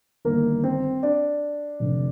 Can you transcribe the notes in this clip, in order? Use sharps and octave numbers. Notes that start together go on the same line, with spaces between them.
G1 G2 D#3 A#3 A#4
C4 C5
D4 D5
F1 F2 D3